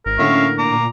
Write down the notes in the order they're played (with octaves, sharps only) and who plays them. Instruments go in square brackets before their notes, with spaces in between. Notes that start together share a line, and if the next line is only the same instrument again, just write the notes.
[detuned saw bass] G#1 [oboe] A#4
[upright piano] A2 D3 A#3 [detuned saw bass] C#4 [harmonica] E5 F5 C#6
[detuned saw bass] A#2 [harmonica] A#5 D6